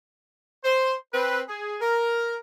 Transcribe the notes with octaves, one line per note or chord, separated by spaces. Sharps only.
C5
C4 B4
G#4
A#4